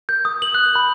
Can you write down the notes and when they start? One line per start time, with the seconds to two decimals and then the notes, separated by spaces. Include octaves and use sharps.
0.09 G6
0.25 D#6
0.42 F#7
0.55 F#6
0.76 B5